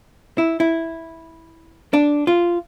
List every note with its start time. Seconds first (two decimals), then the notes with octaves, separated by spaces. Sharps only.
0.38 E4
0.60 E4
1.93 D4
2.27 F4